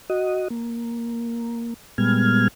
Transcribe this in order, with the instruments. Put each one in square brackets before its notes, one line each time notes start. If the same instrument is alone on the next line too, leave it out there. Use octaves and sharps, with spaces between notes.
[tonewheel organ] F#4 D#5
A#3
A#2 G3 G#3 B3 F6 G#6